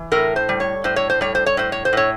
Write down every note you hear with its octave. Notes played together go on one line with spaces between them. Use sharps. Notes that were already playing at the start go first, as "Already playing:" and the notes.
Already playing: E3
A2 A#4
C5
G3
C#5
A2 C5
C#5
C5
G3 C#5
C5
C#5
A2 C5
C#5
C5
A2 C#5